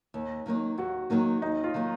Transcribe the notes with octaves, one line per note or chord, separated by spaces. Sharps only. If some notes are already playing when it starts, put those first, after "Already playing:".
D#2
D#3 F#3 A#3 D#4
D#2 F#4
D#3 F#3 A#3 D#4
D#2 D#4
F4
D#3 F#3 A#3 D#4